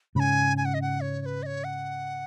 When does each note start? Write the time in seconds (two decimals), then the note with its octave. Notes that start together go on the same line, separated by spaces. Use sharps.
0.15 G#2 C#3 G#5 B5
0.57 G#5
0.65 F#5
0.74 D#5
0.82 F#5
1.01 C#5
1.21 C#5
1.26 B4
1.43 D#5
1.46 C#5
1.64 F#5